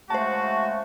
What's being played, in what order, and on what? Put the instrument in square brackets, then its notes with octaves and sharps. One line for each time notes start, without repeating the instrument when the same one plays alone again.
[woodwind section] C#3 G#3 A3 [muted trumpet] F#4 [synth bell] C5 A5